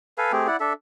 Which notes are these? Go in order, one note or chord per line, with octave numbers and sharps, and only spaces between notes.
A4 B4 F5 G#5
A3 C4 G4 G#4
E4 D5 F#5
D4 A4 E5